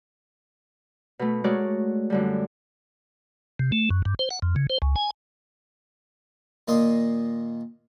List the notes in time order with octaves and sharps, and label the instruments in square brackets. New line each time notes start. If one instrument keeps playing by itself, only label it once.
[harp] B2 A3
G#3 A3 F#4 A#4 C#5 D5
F#2 D3 G3
[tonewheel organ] C3
A3
F#2
G2
C5
F#5
F2
C#3
C5
C#2
G#5
[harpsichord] A#2 D#3 A#3 D#5 C6 D#6